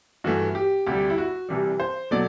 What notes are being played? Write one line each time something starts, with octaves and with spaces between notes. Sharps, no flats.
G2 E3 A3 F#4
G4
D2 C3 G3 G4
E4
F#4
C2 C3 E3 G3
C5
B2 F#3 A3 D5